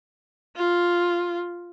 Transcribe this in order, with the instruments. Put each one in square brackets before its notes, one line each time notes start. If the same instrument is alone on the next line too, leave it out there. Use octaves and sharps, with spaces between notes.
[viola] F4